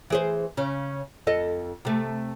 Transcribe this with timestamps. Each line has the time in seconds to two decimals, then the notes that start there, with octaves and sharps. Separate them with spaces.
0.10 E3 G#4 C5
0.57 C#3 C#4
1.27 F2 A4 D#5
1.85 C3 A3